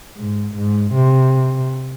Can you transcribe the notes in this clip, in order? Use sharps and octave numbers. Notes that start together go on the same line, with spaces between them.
G#2
G#2
C3